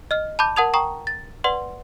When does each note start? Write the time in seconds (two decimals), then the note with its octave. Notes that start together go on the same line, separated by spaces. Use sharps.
0.11 D#5 F6
0.39 A5 B5 D6 G6
0.56 A#4 F#5 A5 D#6 G#6 F7
0.74 G5 A#5 C#6 D#6
1.07 A6
1.44 B4 D5 F#5 C6